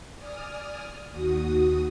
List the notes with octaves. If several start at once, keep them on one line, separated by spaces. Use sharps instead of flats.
D5 G#5 D#6 F6
D#2 F#4 D#6